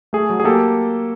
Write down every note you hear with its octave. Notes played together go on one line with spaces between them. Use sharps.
A3 G#4
F#3
G#4
A#3 G4 A4